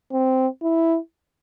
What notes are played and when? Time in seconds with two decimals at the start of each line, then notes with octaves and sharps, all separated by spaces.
0.12 C4
0.62 E4